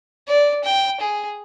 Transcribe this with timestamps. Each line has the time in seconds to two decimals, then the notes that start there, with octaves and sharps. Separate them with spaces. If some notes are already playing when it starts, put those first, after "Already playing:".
0.28 D5
0.64 G5
1.00 G#4